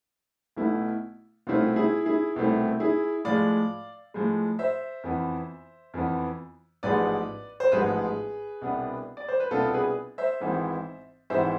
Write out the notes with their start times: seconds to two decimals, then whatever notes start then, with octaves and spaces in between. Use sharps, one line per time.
0.56 B1 B2 A3 E4
1.47 C2 B2 A3 C4 E4 F4
1.76 E4 G#4
2.06 E4 G#4
2.36 C2 B2 A3 C4 E4
2.80 E4 G#4
3.25 A2 F3 G#3 D5 F5
4.14 A2 F3 G#3
4.59 C5 E5
5.04 F2 E3 B3
5.94 F2 E3 B3
6.83 A1 G#2 F3 G#3 B3 B4 D5
7.60 C5
7.72 A1 G#2 F3 G#3 B3 G#4 B4
8.62 C2 B2 B3 D4
9.17 D5
9.28 C5
9.40 B4
9.51 C2 B2 B3 D4 F4 A4
9.73 G#4 B4
10.18 C5 E5
10.40 G#1 G#2 E3 B3
11.30 G#1 G#2 E3 B3 C5 E5